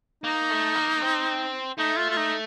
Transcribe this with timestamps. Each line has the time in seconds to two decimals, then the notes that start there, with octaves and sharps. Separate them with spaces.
0.24 A#3 D#4
0.50 A3
0.76 A#3
1.02 C4
1.78 A3 D#4
1.97 F4
2.10 F4
2.17 D#4